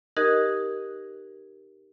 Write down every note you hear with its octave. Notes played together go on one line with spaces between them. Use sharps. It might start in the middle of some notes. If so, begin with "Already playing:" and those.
D#4 G4 A#4 D#5 F#6 G#6